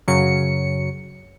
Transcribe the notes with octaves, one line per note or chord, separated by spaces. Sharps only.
F#2 C#3 F#3 C#7